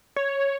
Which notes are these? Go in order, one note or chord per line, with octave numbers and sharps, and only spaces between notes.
C#5